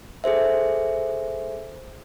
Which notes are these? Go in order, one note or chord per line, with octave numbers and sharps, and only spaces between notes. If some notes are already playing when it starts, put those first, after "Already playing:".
G#4 A4 C5 E5